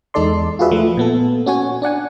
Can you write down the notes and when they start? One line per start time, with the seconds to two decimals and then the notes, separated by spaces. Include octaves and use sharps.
0.14 E2 G#3 D#4 A4 D5 C6
0.59 F4 F#4 G#4 B4 E5
0.71 F3 A3
0.97 A#2 B3 A4
1.46 C#4 F#4 C#5 G#5
1.82 D4 D5 F#5 G#5